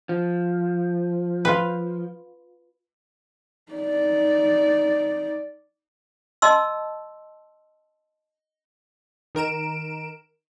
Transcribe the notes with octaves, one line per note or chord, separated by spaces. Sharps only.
F3
F4 B4
D#4 D5
D#5 A5 C6 E6
D#3 A#4 D7 E7